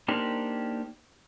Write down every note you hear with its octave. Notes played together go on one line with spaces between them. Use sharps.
A#3 D4 D#4 G4 A#4 C5